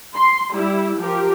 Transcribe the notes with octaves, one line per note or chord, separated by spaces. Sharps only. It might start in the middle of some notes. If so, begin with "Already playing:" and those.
C6
G3 E4
F3 G4 A#4